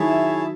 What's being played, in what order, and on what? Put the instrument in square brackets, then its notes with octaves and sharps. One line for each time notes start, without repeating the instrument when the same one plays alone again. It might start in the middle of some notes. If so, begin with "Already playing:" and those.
Already playing: [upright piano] D#3 F#3 [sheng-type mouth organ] E4 G#4 C#5 E5 A5